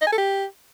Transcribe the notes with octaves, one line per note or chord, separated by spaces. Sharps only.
D#5
G#5
A4
G4